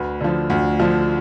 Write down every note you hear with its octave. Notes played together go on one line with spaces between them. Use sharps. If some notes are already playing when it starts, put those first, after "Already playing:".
Already playing: D2 B4
D3 F3
D2
D3 F3